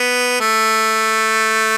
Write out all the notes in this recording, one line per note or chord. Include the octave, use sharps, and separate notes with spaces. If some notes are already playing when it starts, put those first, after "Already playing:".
Already playing: B3
A3